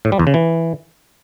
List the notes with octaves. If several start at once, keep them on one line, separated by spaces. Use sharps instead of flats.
A2
G3
E2
C#3
E3